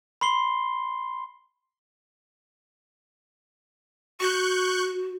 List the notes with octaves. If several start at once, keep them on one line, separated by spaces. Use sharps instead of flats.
B5 C6 C7 G7
F#4 C#6 F#6 G6